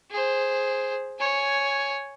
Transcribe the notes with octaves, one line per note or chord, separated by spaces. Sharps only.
G#4 C5
C#5 G#5